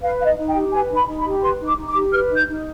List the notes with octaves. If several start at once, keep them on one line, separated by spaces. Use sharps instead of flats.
B4 F5
D#4 D#5 F5
D#4
G5
G4
B4 G#5
D#4
B5
D#4
B5
G4
B4 C6
D#4
D6
D#4
D6
G4
B4 F6
D#4
G6
D#4